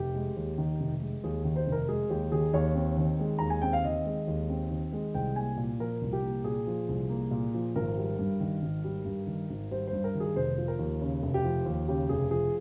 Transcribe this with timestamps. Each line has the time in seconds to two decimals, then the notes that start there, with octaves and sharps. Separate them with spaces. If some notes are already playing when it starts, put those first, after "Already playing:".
Already playing: F1 G4
0.14 G#3
0.36 D#2
0.58 D#3
0.80 F1
1.02 G#3
1.24 D#2 G#4
1.44 D#3
1.56 C5
1.66 F1
1.72 A#4
1.88 G#3 G#4
2.10 D#2 G4
2.32 D#3 G#4
2.53 D#2 C#5
2.75 C4
2.97 D#3
3.19 G#3
3.39 D#2 A#5
3.50 G#5
3.62 C4 G5
3.73 F5
3.84 D#3 D#5
4.06 G#3
4.27 D#2
4.50 C4
4.70 D#3
4.92 G#3
5.14 C2 G5
5.36 A#3 G#5
5.57 A#2
5.79 F3 A#4
6.02 C2
6.13 G4
6.23 A#3
6.44 A#2 G#4
6.67 F3
6.89 C2
7.10 A#3
7.31 A#2
7.54 F3
7.75 G#1 A#4
7.97 G3
8.19 G2
8.40 D#3
8.62 G#1
8.84 G3
9.05 G2
9.27 D#3
9.50 G#1
9.71 G3 C5
9.87 C5
9.93 G2
10.04 A#4
10.15 D#3
10.20 G#4
10.36 F1 C5
10.58 F3
10.68 A#4
10.79 D#2
11.02 C#3
11.23 F1
11.34 G4
11.44 F3
11.66 D#2
11.88 C#3 G4
12.09 F1 G#4
12.31 F3 G#4